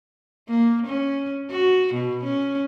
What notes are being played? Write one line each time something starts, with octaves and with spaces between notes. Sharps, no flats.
A#3
C#4
F#4
B2
C#4